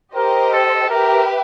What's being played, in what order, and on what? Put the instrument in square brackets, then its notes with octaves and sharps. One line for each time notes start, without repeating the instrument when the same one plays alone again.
[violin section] G4 C5 D#5 [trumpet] A#4
[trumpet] A4
[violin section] G4 B4 E5 [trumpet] A#4